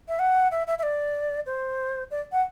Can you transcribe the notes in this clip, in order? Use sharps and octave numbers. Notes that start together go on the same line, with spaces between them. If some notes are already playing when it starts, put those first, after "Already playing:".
E5
F#5
E5
E5
E5
D5
C5
D5
F#5